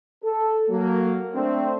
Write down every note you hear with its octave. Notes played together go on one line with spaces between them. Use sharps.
A4
F#3 A#3
A3 C4 D4